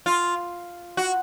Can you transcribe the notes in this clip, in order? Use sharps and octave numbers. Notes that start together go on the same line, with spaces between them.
F4
F#4